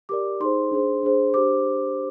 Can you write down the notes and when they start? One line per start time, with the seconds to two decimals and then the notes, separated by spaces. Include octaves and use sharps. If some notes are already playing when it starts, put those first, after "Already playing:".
0.09 G4 A#4 D5 D6
0.40 D#4 G#4 C5 C6
0.71 D4 G#4 C5
1.03 D4 G#4 C5
1.34 D4 G4 C5 D6